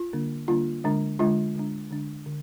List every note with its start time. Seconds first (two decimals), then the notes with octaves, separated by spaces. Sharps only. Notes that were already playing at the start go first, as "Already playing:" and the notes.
Already playing: F4
0.13 D3 G3 A#3 D4
0.48 D3 G3 A#3 D4 F4
0.84 D3 G#3 D4
1.19 D3 G#3 D4 F4
1.55 D3 G#3 D4
1.91 D3 G#3 D4
2.26 D3